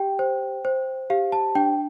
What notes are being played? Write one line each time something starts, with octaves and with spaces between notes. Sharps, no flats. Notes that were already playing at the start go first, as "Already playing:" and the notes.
Already playing: G4 G5
C5
C5
G4 F5
A5
D4 G5